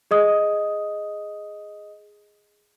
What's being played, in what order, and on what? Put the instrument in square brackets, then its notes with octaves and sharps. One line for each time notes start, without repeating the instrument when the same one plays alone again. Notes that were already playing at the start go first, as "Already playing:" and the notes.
[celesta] G#4 D#5 D#6